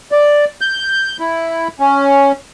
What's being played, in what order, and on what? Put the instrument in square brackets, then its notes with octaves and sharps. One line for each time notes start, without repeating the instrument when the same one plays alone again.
[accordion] D5
G6
E4
C#4